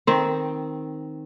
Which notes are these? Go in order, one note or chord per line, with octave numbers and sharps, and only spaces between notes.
D#3 C4